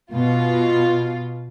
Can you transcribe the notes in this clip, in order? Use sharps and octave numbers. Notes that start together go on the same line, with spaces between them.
B2 F4